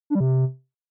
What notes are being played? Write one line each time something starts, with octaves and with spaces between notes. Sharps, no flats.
D4
G3
C3